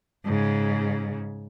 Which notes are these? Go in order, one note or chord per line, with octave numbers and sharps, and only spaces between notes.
G#2 C#3